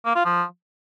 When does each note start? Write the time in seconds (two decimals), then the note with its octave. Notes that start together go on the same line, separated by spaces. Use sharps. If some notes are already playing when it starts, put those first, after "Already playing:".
0.06 A#3
0.15 F4
0.25 F3